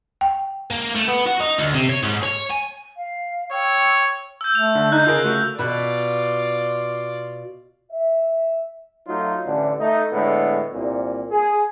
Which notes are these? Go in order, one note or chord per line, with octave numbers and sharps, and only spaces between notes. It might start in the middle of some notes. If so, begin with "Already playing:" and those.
G5
A#3
A3
B3
F#4
D#4
D2
C3
C#5
G#2
C#5
G#5
F5
C#5 G5 E6 F6
E6 G6
A3 F7
D3
D#4 F#6 G6
C#3 F4 G#4 A#4
A3 F#4
B2 F4 B4 D5
E5
F#3 A3 D#4 F4
A1 D3
A3 D#4
A2 D3 G#3 B3
C2 A#2
G#4